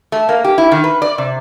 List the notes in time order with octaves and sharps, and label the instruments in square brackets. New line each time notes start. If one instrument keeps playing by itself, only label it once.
[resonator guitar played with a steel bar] A3
A#3
G4
E4
D#3
B4
D5
C3